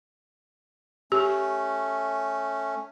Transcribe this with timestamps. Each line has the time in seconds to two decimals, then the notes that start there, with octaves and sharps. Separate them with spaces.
1.12 A3 C#4 G4